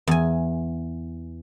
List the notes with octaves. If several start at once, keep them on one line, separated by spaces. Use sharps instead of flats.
E2 G#5